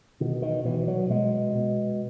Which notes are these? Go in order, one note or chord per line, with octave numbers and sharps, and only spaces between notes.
B2 D#3
D#3
B2 E3
F#3
B2 G#3
B2